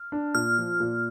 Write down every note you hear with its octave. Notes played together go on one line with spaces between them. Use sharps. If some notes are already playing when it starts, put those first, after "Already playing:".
Already playing: F6
D4
A#2 F6
F3
A#2